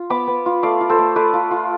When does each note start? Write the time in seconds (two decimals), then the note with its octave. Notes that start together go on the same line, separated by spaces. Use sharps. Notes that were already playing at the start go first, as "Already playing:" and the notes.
Already playing: F4
0.10 B3 B5 D6
0.28 B3
0.46 F4
0.63 A3 D5 F5
0.81 F4
0.89 A4 C5
0.99 A3
1.16 A3 B4 D5
1.34 F4
1.51 F4